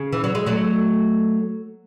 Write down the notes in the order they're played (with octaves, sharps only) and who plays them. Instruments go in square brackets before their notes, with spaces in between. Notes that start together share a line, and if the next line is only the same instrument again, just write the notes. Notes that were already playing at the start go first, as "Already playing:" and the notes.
Already playing: [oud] C#3
E3
F#3
G#3
F#3 A3